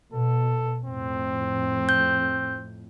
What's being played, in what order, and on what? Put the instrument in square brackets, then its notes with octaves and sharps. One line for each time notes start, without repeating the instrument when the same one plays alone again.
[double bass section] B2 [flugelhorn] A4
[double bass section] F2 A2 [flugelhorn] C4
[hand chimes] G6